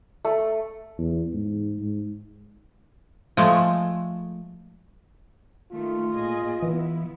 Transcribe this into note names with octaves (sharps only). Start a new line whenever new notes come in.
A3
E2
G#2
G#2
F3 G#3 A3
D#3 A3 F4
A#2 G#4 D#5
E3 B3 E4